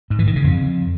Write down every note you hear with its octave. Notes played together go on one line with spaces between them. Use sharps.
G#2
E3
D#3
C#3
F2